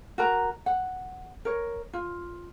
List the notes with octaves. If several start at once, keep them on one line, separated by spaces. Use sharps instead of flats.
F#4 A#4 A#5
F#5
A#4 C#5
F4